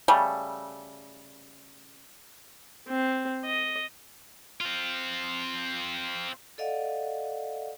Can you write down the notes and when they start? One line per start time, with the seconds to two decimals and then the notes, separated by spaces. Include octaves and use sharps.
0.08 C#3 G3 A3
2.89 C4
3.46 D#5
4.61 C4 F4
6.58 A4 D5 D#5 F5 F#5